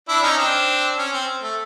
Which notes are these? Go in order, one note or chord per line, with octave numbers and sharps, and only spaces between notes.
D4 E4
C#4 D#4
C4 D4
C#4
C4
A3